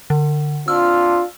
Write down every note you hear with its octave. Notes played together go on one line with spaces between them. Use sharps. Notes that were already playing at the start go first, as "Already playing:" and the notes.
D3
C4 D4 F4 E6 F6